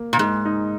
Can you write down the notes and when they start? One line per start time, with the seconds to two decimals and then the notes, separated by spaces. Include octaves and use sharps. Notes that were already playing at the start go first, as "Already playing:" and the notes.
Already playing: A#3
0.13 A#2
0.19 G#2 G#3
0.45 D#4